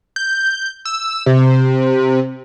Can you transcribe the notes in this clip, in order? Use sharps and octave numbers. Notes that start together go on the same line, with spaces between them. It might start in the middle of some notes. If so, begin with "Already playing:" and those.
G6
E6
C3